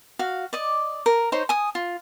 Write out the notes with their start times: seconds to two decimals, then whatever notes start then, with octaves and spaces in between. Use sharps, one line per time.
0.19 F#4 F5
0.53 D5 D#5
1.06 A#4
1.32 D#4 C5 C#5 C6
1.49 G#5 D#6
1.75 F4